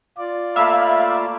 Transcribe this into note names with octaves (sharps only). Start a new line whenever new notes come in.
F4 D5
A3 A#3 E5 F5 B5